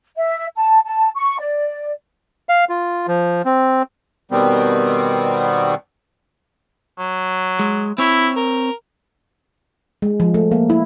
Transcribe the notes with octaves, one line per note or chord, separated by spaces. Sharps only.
E5
A5
A5
C#6
D5
F5
F4
F3
C4
B2 D#3 G3 B3 C4
F#3
G#3
C4 E4 C#5
A#4
G#3
F3
A3
A#3
E4